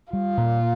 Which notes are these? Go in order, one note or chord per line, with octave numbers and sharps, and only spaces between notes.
G3 F4
A#2